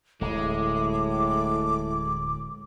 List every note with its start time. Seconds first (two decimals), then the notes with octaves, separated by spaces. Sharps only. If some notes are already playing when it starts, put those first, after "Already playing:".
0.21 D1 A2 G#3 D6